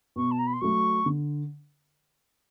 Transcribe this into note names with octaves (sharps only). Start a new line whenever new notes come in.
B2 C#6
A5
A#5
B5
C6
F#3 A3 C#6
D3